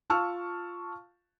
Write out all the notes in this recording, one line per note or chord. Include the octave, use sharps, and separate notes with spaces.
F4 F5 A5 C#6 E6 F6